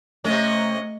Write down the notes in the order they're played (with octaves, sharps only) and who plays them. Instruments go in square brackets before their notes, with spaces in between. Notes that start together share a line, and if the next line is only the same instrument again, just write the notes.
[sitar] C3 C#4 [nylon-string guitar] A3 [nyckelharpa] D#5